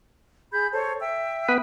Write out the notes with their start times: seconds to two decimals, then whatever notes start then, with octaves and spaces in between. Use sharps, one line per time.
0.52 G#4 B5 G6
0.72 A4 C5 C#5
0.99 E5 G5 E6
1.49 B3 B4